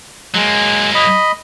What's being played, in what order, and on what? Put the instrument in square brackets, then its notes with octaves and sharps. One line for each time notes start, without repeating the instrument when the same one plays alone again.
[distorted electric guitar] F#3 A#3 [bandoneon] G#3
[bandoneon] D#5 B5